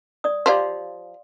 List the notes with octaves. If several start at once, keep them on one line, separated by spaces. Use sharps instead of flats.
D5 D#6
F3 G4 C5 D5 F5 C6